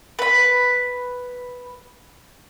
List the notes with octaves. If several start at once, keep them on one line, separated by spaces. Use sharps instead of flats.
B4 B5